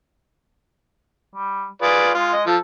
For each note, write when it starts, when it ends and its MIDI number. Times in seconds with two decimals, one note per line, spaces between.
1.35 1.68 55
1.82 2.10 65
1.82 2.13 68
1.82 2.10 71
1.82 2.10 74
2.14 2.43 56
2.14 2.32 65
2.33 2.42 75
2.47 2.56 53
2.47 2.58 69